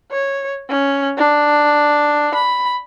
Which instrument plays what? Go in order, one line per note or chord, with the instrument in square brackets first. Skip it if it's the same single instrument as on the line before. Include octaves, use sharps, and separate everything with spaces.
[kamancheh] C#5
C#4
D4
B5